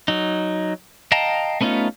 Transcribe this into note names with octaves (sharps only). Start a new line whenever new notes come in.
F#3 D#4
D#5 F5 G5 A5 A#5
A3 B3 C#4 D#4 F4